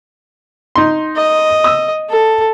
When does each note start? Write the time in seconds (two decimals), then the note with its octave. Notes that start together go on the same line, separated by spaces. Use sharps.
0.76 D#4 C6
1.16 D#5
1.64 D#6 E6
2.09 A4